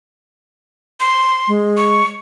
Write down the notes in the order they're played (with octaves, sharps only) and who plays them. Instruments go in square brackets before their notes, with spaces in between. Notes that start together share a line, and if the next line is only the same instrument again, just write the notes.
[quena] C6
[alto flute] G#3
[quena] C#6